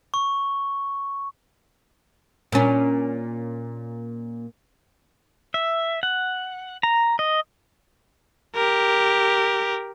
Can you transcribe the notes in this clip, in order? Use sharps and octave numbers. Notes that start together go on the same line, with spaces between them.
C#6
A#2 C#4
E5
F#5
A#5
D#5
G4 A#4